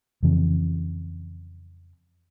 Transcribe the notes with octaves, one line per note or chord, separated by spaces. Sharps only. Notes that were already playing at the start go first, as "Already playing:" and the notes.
F2 C#3 E3 C4